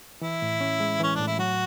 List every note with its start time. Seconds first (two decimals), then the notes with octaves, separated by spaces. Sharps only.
0.22 E3 E4
0.42 A2
0.61 C#4
0.80 G#3
1.00 E3 C#4
1.15 A2 D4
1.27 E4
1.39 F#3 F#4